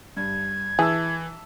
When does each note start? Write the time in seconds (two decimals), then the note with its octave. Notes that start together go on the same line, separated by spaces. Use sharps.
0.17 G2 G#6
0.79 E3 G#4 E5 A5 E6